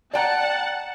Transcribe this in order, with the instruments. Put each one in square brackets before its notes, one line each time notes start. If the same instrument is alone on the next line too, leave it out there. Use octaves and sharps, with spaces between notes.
[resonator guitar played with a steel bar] D5 G5 A#5 [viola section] F#5 A5